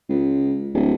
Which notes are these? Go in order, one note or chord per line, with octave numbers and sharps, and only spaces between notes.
C#2
D1